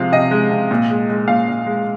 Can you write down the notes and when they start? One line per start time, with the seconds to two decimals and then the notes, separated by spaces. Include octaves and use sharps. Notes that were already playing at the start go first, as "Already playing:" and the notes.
Already playing: C3 F3 G#3 F5
0.12 C3 D#5
0.31 G#3
0.51 C3
0.71 A#2
0.90 G#3
1.10 G#3
1.28 A#2 F5
1.48 A#2
1.67 G#3